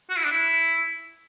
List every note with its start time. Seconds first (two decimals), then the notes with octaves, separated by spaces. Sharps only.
0.10 F#4
0.17 E4
0.25 D4
0.32 E4